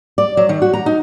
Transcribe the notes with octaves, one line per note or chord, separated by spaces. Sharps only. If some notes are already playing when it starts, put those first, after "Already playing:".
D5
F#3
D#3
F#4
A#5
D#4